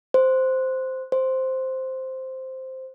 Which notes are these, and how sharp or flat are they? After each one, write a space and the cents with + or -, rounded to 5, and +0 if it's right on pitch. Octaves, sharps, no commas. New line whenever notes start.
C5 -5
C5 +0